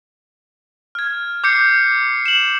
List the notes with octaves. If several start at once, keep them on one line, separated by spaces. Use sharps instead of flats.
F6 G#6
D6 G6 C7 C#7
E7 F#7